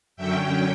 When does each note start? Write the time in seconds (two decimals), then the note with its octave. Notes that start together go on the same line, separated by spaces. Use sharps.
0.16 F#2 D3 F#3 C#4 E5 G5